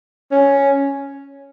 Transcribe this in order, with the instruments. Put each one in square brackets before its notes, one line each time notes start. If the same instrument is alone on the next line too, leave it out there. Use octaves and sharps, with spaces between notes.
[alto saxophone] C#4